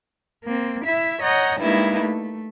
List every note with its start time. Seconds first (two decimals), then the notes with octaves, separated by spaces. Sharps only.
0.45 A#3 C4
0.84 E4 E5
1.21 C#5 D#5 F#5 A#5 G6
1.60 G2 G#3 A#3 D#4 E4
2.01 A3